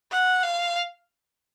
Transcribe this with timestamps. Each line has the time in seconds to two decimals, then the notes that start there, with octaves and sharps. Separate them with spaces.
0.11 F#5
0.43 F5